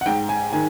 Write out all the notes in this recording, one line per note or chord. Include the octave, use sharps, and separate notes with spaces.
F#5
G#2 G5
G#5
D#3 G#5